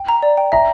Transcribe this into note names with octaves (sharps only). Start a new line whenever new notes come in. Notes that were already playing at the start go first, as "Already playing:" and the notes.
Already playing: G5
A#5
D5
G5
E5 A#5